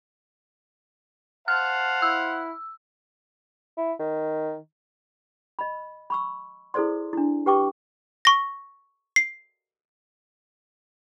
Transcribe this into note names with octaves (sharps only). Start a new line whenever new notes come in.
C5 F5 F#5 A5 F6
E4 E6
E4
D#3
D#5 B5
B5 C#6 E6
E4 G#4 A4 C5 D5 C6
D4 E4
G4 B4 G5 C#6 D6
C#6 A#6
C7